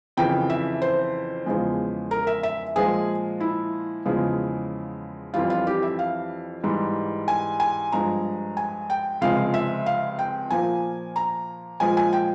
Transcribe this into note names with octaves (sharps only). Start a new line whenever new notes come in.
F2 C#3 E3 G5
E5
C5
E2 C#3 F3 G#3
A#4
E5
E5
A#2 F3 G#3 G#4
E4
E2 C#3 F3 G#3
F2 E3 G3 F4
F4
G4
E5
F5
G#2 E3 G3
G#5
G#5
G2 F3 G#3 A#5
G#5
G5
C#2 C3 F3 G#3 F5
E5
F5
G5
A#2 F3 A#3 G#5
A#5
A#2 F3 G#3 G#5
G#5
G5